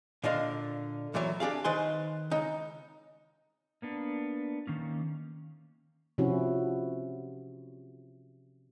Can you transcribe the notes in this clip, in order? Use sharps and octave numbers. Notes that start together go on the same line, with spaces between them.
A#2 D3 D4 D#5 F5
E2 A#2 E3 F#3
D4 G4 G#4 F5
D#3 B4 C5 G#5 C6
C#2 D#4
A#3 B3 D4
D#3 A#3 C#4
C3 F3 C#4 E4 F#4